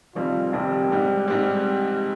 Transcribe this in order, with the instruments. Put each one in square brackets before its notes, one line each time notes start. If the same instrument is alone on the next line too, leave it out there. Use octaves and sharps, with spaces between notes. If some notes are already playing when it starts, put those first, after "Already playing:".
[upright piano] F1 F2 D#3 G3 C4 [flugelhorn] F4
[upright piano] F1 F2 D#3 G3 C4 [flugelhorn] G4
[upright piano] G#2 G3 C4
[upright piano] G#2 G3 C4 [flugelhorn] G4